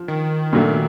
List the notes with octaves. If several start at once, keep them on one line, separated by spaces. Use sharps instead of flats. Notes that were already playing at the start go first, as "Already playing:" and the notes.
Already playing: F3
D#3
A#2 F#3 A3